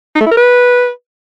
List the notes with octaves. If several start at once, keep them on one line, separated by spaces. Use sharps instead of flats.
D#4
A3
E4
A#4
B4